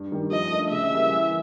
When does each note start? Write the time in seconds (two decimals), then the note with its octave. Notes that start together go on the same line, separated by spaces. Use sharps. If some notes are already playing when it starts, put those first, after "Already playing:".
Already playing: G2
0.12 D#3 G3
0.31 F3 D#5
0.51 A3 D4
0.71 C#3 E5
0.91 E3 G3 A#3
1.10 E3